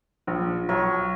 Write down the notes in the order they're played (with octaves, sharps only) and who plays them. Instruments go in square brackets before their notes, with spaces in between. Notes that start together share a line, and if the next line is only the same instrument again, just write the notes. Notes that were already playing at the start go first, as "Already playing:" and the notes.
[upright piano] A#1
[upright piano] B1 [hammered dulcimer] C#5